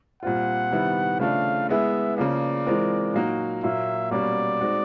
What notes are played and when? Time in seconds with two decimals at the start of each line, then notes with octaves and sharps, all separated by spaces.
0.22 A#2 G3 C4 F4 F#5
0.71 C3 D#3 G3 B3 E4
1.20 C#3 F3 A3 D4 F5
1.69 G#3 B3 E4 G#4 E5
2.17 C#3 F3 A#3 D5
2.66 E3 G#3 C4 F4 A#4
3.14 A#2 F#3 A#3 D#4 F#4
3.63 A#2 F#3 A#3 E5
4.11 B2 G3 A#3 C#4 F#4 D5
4.60 G#3 C4 D#4 F#4